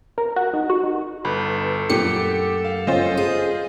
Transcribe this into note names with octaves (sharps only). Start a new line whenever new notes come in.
A#4
F#4
D#4
F#4
D#4
G1 A4 B4
F#2 A#2 A3 G4 C#7
F5
G1 C#4 F4 C5 D#5
G#4